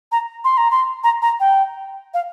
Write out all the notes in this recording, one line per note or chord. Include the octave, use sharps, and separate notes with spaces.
A#5
C6
A#5
C6
A#5
A#5
G5
F5